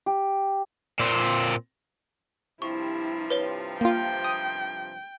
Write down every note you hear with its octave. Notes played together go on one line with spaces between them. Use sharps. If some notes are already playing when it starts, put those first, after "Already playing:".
G4
A#2 C4
G2 C3 F3 E4 C#6
B4 C#5 G7
A#3 F4 G5
D#6